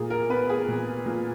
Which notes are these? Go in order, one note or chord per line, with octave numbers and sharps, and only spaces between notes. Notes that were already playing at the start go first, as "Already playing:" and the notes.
Already playing: A#2 G#4
A#4
B3 B4
G#4
A#2
A#2